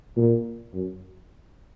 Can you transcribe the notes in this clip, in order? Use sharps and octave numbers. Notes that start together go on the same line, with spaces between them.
A#2
F#2